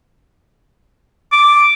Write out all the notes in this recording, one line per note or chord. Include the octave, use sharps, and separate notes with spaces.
D6